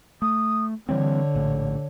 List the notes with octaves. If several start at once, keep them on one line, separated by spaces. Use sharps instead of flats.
A3 D#6
D3 E3 G3 C4 C#5
A#1 A2